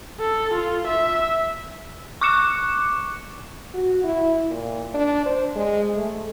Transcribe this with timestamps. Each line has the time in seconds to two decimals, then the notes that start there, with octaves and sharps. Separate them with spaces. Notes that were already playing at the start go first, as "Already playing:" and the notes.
0.20 A4
0.54 F4
0.87 E5
2.21 C#6 D6 F#6 C#7 E7
3.74 F#4
4.04 E4
4.50 A#2
4.94 D4
5.25 C5
5.55 G#3
5.95 A3